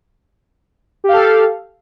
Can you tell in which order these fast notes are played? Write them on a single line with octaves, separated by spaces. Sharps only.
G4 F5 A4